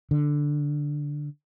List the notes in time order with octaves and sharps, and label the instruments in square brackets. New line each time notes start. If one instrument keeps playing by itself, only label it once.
[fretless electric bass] D3